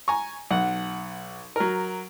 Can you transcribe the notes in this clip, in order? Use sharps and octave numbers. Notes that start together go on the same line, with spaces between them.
G#5 A#5 C#6
B1 F#5
F#3 A#4